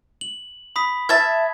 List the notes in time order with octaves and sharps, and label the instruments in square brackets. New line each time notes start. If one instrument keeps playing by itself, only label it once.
[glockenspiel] F#7
B5 D#6 B6
[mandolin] E5 A5 [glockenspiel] G#6